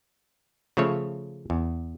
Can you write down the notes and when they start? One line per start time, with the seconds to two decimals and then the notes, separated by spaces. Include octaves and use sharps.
0.77 C#3 F3 A3 C#5
1.50 E2